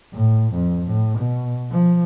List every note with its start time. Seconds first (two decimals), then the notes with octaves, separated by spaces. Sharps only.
0.13 A2
0.54 F2
0.86 A2
1.19 B2
1.71 F3